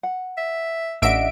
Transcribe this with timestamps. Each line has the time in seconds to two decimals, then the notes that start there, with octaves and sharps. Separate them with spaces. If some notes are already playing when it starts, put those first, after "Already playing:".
0.03 F#5
0.37 E5
1.02 A1 D4 D#5 E5 F#5 D7